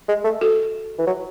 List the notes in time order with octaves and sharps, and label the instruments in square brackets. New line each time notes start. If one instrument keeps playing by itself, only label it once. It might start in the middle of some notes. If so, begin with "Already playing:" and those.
[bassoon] G#3
A3
[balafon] F#4 A4
[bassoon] E3
F#3